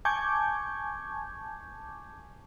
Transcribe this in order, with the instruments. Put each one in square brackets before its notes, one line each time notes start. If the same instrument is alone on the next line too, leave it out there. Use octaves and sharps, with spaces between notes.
[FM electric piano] G#5 A5 C#6 D6 G6 G#6